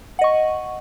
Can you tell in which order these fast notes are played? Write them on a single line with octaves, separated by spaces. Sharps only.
F#5 D#5 C#6